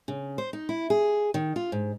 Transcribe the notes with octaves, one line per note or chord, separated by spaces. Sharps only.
C#3
C5
D#4
E4
G#4
D#3
F4
G#2